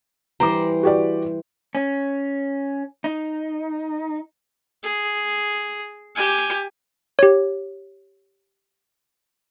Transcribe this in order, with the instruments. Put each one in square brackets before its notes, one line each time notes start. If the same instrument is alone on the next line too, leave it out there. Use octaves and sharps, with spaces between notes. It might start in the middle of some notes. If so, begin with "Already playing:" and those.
[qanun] E3 G3 C5 [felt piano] A#5 D6
[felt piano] F#4 G4 D5
[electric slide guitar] C#4
D#4
[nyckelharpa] G#4
G4 G#5
[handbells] G4 C#5